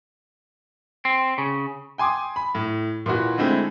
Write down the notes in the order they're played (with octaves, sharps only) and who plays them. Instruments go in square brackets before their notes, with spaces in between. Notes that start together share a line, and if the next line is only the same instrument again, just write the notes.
[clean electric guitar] C4
C#3
[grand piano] G5 G#5 C6 D6 D#6
B5
A2
A#2 E3 E4 F#4
D3 G#3 A3 C4 E4